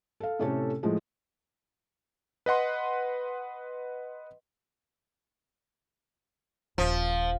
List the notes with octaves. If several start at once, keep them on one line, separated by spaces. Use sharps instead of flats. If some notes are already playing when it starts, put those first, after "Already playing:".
A4 F5
A2 C3 A3 C#4 A4
A2 F3 G#3
B4 D#5 F#5 C6
D#1 F3